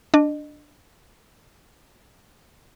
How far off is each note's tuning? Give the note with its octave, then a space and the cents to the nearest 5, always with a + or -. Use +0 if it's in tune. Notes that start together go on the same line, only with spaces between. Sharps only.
D4 +0 D#5 -30